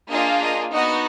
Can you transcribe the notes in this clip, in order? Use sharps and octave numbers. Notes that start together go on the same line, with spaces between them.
A#3 D4 F4 G#4 D#5
D#5
B3 D#4 F#4 D#5